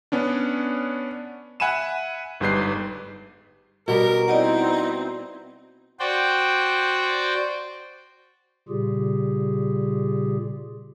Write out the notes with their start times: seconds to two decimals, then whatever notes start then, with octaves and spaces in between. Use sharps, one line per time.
0.12 B3 C#4 D4
1.60 E5 F#5 G#5 B5 D#7 E7
2.40 G1 G#2 G3 B4 G6 C7
3.88 B2 G3 A#4
4.28 C4 D#4 E4 D5 D#5 F#5
6.00 F#4 C5 D5 G5
8.68 A#2 C#3 G3 F4 G4 G#4